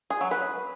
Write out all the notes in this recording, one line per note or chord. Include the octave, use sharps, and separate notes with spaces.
G#4
F#3
B4